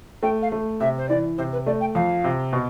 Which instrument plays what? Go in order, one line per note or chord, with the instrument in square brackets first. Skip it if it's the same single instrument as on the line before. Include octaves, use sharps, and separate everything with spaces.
[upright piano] A3 [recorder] G5
[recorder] F5
[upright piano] A3
[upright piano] C3 [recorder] E5
[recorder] C5
[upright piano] E3 [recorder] D5
[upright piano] C3 [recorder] C5
[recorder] B4
[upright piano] A3 [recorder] D5
[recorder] G5
[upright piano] F2 [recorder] F5
[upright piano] C3
B2